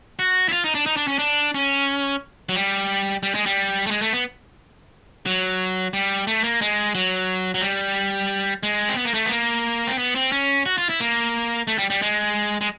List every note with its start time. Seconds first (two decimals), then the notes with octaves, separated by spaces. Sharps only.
0.19 F#4
0.49 E4
0.52 F4
0.64 D#4
0.75 D4
0.86 D#4
0.97 D4
1.08 C#4
1.19 D4
1.54 C#4
2.49 F#3
2.55 G3
3.23 G3
3.34 G#3
3.46 G3
3.86 A3
3.91 G#3
4.02 A3
4.13 B3
5.26 F#3
5.93 G3
6.27 A3
6.44 A#3
6.61 G#3
6.95 F#3
7.54 F#3
7.62 G3
8.63 G#3
8.89 C4
8.97 B3
9.05 A#3
9.14 A3
9.26 B3
9.31 A#3
9.87 C4
9.98 B3
10.15 C4
10.32 C#4
10.66 F#4
10.78 F4
10.89 E4
11.00 A#3
11.67 A3
11.78 G3
11.90 G3
12.02 G#3
12.61 G#3